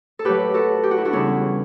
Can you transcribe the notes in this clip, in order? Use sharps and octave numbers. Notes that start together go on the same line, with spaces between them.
A4
A2 F#3 G4 B4
F#4 A4
G4
F#4
E4
D4 F#4
E2 C#3 G3 C#4 E4